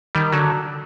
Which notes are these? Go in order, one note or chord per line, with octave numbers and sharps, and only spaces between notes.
D#3 G3
D3 F#3